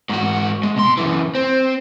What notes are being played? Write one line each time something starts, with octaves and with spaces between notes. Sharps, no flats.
G#2 F#4
G#3
B2 C6
F#2 E3
C4